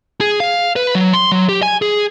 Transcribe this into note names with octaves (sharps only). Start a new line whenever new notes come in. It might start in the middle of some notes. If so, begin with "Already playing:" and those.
G#4
F5
B4
F#3
C6
F#3
G4
G#5
G#4